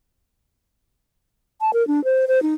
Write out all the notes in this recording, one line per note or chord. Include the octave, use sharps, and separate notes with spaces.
A5
A#4
D4
C5
C5
D#4